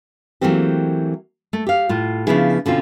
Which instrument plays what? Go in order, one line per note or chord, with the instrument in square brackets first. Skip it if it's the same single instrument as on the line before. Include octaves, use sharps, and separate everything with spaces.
[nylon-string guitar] E3 F#3 A3 A#3 C4 G4
A3
G4 F5
A2 F4
C#3 F3 B3 D4 E4 G#4
B2 D3 C4 C#4 F4